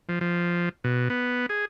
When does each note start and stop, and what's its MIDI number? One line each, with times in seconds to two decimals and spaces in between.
0.09 0.19 53
0.21 0.69 53
0.84 1.09 47
1.10 1.46 59
1.49 1.65 68